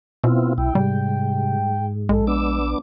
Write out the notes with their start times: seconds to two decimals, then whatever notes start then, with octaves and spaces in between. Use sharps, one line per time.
0.24 B2 B3 C4 E4 F4
0.58 B1 E4 G5
0.75 G#2 C3 G3
2.09 A#1 G#3 A4
2.27 B3 D4 D6 E6